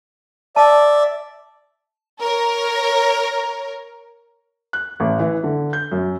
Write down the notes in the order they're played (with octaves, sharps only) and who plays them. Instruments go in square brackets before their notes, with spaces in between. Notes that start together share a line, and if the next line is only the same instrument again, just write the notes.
[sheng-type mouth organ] D5 E5 [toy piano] A5
[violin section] A#4 C#5
[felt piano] F#6
A1
E3
D3
G6
F#2